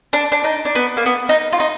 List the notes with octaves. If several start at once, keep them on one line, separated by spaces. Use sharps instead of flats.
D4
D4
D#4
D4
B3
A#3
B3
D#4
F4
D#4